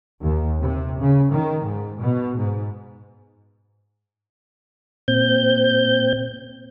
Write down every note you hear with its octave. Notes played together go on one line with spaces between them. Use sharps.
D#2
C3
C#3
D#3
G#2
B2
G#2
A#2 C4 G6